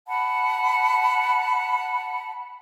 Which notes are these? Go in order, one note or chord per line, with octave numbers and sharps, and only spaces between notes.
F#5 A5 B5